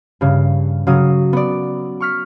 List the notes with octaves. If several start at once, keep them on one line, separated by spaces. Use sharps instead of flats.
G2 C#3
C#3 F#3 D#6
B3 D5
C#6 F6 B6